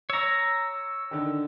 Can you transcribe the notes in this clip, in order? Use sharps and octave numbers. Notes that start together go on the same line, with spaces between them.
C#5 A#5 E6
D3 D#3